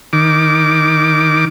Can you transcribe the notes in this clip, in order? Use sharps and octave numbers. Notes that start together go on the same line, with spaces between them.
D#3 D6